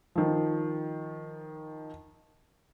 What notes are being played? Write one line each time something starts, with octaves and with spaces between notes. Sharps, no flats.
D#3 F3